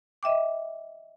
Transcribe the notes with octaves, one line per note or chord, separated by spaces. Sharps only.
D#5 E5 G5 D6